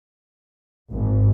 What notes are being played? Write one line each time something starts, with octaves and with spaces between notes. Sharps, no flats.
G#1